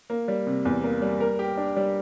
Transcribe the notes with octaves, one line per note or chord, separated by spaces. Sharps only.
A#3
G3
C3
E2
A#3
G3
A#4
G4
D4
G3